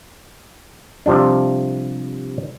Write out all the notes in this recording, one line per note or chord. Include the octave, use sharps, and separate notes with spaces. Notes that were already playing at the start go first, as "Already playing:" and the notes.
C3 F3 G3 D4